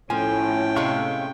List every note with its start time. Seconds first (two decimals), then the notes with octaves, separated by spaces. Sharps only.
0.10 A2 F3 C#4 G5 G#5
0.76 C3 G#3 A3 F5 C#6